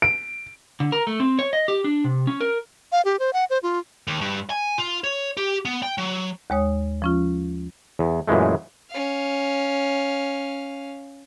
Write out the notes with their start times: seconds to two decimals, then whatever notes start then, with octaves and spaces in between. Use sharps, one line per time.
0.02 D7
0.80 D3
0.92 A#4
1.07 A3
1.20 C4
1.39 C#5
1.53 D#5
1.68 G4
1.84 D4
2.04 C3
2.27 C#4
2.41 A#4
2.92 F5
3.05 G4
3.19 C5
3.33 F#5
3.50 C5
3.63 F4
4.07 D#2
4.21 G2
4.50 G#5
4.78 F4
5.04 C#5
5.37 G4
5.65 B3
5.83 G5
5.98 F#3
6.50 D#2 G#3 C#5 D#6
7.02 F3 C#4 F4
7.99 E2
8.28 F#2 A#2 E3 G#3 A3
8.90 C#4 F5